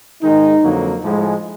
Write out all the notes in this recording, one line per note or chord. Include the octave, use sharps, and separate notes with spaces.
G#2 D#3 G#3 D#4
F2 D3 F#3 A#3
A2 F3 G#3